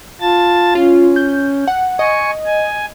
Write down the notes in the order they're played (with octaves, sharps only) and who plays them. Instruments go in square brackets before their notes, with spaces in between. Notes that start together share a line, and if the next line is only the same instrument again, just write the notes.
[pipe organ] F4 A5 A6
[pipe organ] C#4 [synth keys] F4
[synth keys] G6
F#5
[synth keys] D#5 [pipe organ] G#5 C#6
[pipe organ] G#5